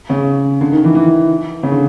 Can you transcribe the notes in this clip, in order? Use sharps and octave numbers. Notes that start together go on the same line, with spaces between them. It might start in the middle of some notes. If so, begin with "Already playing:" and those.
C#3
D3
D#3
E3
E3
C#3
D3